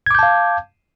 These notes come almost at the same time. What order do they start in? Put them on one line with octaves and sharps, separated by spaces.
G#6 D6 G6 A5 F5